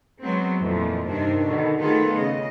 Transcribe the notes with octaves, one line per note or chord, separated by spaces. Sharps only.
F#3 G#3 B3 C4
F2 A#2 E3 F3
G2 C3 D#3 D4
B2 D3 D#3
D#3 A3 B3 F4 G#4 A4
C#3 D#5